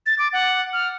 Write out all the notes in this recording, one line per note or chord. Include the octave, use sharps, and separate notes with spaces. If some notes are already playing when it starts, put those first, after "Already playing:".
A6
D6
F#5
F6